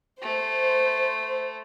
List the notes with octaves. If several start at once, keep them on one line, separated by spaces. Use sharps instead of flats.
A3 C5